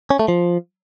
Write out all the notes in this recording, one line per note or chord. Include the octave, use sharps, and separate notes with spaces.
C#4
A3
F3